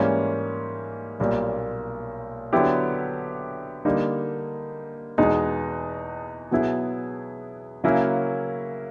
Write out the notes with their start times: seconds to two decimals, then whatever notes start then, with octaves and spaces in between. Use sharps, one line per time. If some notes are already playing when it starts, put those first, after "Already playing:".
Already playing: G#2 E3 G3 A#3 C#4
1.20 B1 A#2 G3 A#3
2.53 D3 F#3 B3 E4 G4
3.85 D3 G3 A#3 D#4
5.18 E2 B2 G#3 B3 D#4
6.51 B2 F#3 B3 E4 G#4
7.84 C#3 F#3 A#3 C#4 E4